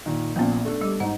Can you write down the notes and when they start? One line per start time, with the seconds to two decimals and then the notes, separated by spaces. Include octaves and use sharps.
0.06 A#2 D#3
0.36 A#1 A#2 A#3 B3 C#4
0.65 A3 D4 A4
0.81 G3 G4
1.00 G#2 D#4 F#5